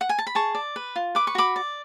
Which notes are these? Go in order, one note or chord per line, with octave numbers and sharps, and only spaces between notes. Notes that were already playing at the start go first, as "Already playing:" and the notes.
F#5
G#5
A5
B5
G#4 A5 C#6
D5
B4
F4
B4 D6
C#6
F#4 B5 D6
D5